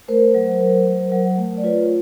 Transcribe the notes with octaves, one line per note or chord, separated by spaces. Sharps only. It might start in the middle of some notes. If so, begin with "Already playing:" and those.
A3 A#4 C5
F#3
F#3
F#3
F#3
A3
D5
F4 B4 C#5